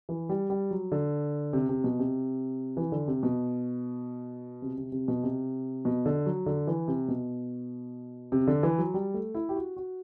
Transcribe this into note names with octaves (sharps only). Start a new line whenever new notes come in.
E3
G3
G3
F#3
D3
C3
C3
B2
C3
E3
D3
C3
B2
C3
C3
C3
B2
C3
B2
D3
F#3
D3
E3
C3
B2
C3
D3
E3
F#3
G3
A3
E4
G4
F#4
F#4